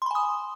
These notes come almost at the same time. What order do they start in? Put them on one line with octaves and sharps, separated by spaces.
C6 B5 G#5 D#6